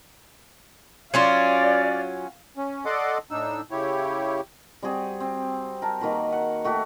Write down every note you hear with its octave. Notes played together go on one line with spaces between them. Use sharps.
F#3 C#4 F4 D5 F5
C#4
A4 D5 D#5 F#5 C6 D6
A2 D4 D#4 E6
C#3 E4 G4 C#5
G3 C4 F#4 G#4
C4
A#4 A5
D#3 A#3 F#4 B4
F#5
A3 F#4 G4 E5